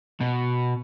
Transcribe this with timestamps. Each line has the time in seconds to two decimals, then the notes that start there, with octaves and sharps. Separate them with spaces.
0.21 B2